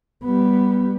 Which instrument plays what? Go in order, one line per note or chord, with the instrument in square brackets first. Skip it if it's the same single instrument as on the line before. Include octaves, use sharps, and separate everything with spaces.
[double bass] G3 B3